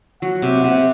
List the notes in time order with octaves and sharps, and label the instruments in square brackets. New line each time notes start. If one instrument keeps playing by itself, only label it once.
[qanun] F#3 [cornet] F#5
[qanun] C3
[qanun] C3 [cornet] F#5